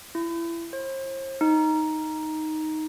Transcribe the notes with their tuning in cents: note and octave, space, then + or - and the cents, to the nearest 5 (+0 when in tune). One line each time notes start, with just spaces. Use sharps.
E4 +30
C5 +40
D#4 +5